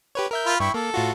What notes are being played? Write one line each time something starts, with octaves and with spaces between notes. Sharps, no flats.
G4 B4 C#5
A#4 E5 G6
F4 B5
G2 E4 G5 C#6
A#3 A4
A2 F4 F#4